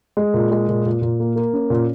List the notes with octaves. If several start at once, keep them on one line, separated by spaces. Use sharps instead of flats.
G#3
A#2
G#3
A#2
A#2
A#2
A#3
A#3
C#4
A#2